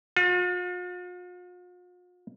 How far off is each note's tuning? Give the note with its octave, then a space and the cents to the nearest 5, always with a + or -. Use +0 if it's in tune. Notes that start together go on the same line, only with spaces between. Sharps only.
F4 +45